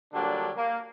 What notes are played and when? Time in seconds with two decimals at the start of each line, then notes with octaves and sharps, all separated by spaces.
0.13 A#2 D3 F#3 G3 D4
0.56 A#3